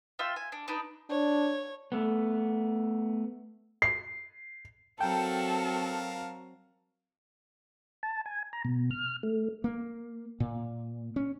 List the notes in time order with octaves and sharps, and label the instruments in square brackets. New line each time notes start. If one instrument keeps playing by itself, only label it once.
[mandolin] F4 E5 G5 C6
G#5
D4
D4 D#4 B4
[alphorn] D4 [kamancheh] C#5
[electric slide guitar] A3 B3
[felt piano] C7
[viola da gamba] F#3 C4 F#4 [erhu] A4 [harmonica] A#4 F5 A5 [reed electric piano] G5
[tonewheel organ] A5
G#5
A#5
B2
F6
A3
[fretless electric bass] A#3
A#2
C#4